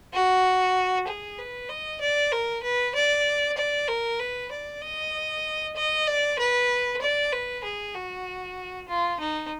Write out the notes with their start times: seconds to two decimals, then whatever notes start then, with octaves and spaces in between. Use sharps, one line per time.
0.13 F#4
1.07 G#4
1.39 B4
1.69 D#5
2.01 D5
2.32 A#4
2.63 B4
2.95 D5
3.57 D5
3.88 A#4
4.20 B4
4.51 D5
4.82 D#5
5.76 D#5
6.07 D5
6.39 B4
7.02 D5
7.33 B4
7.64 G#4
7.95 F#4
8.88 F4
9.20 D#4